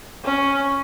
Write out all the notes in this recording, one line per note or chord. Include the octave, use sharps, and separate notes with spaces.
C#4